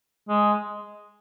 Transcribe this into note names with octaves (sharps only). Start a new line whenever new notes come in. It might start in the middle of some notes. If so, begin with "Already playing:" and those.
G#3